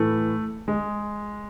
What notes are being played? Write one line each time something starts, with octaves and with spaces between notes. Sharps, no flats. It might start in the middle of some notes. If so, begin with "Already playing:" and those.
Already playing: A2 E3 A3
G#3